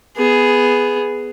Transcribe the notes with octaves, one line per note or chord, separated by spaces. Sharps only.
B3 G#4